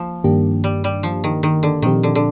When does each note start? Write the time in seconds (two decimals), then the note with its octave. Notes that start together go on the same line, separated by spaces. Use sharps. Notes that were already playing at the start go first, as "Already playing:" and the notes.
Already playing: F3 A#3
0.24 G2 D#3 A#3 D4 G4
0.64 G3
0.84 G3
1.03 F3
1.24 D#3
1.43 D#3
1.63 D3
1.82 A#2 D#3 F3 C4 G4
2.03 D3
2.15 D3